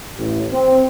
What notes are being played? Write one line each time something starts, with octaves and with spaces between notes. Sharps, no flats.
A1
C4